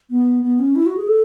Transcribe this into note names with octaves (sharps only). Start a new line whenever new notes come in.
B3
B3
C#4
E4
F#4
G#4
A4